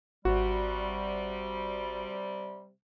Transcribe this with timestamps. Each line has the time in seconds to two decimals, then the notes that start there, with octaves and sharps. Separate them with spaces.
0.25 G#1 C3 G3 F#4